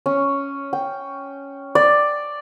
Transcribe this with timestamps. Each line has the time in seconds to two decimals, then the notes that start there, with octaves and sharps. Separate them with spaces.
0.06 C#4
0.73 G5
1.75 D5